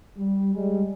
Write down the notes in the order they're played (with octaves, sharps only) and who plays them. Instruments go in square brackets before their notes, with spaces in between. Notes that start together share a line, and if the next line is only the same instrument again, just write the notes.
[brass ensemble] G3
G3 G#3